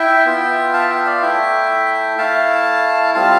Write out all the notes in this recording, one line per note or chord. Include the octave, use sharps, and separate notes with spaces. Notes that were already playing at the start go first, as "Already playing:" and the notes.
Already playing: E4 E5 G5
B3 F4
F5 A5
E5 G5
D5 F5
A3 E4 E5 G5
A3 E4 F5 A5
G3 C4 F4 F5 A5